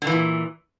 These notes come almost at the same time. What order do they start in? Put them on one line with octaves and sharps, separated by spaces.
D3 E3 A#2